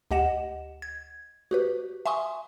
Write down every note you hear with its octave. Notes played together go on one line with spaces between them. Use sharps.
D2 G4 D#5 F#5 E7
G#6
F#4 G4 B4
E5 G#5 C6 C#6 D#6